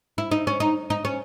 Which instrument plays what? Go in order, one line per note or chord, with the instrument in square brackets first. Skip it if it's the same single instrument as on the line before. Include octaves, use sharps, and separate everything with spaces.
[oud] E4
D#4
C#4
D#4
D#4
C#4